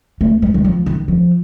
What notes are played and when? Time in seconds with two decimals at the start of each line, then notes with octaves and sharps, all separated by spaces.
0.21 A3
0.42 G3
0.54 D#3
0.64 F3
0.86 D#3
1.08 F3